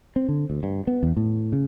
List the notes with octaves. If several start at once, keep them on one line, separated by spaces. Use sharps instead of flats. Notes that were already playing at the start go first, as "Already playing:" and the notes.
C4
D3
D2
G2
B3
E2
A2
C#3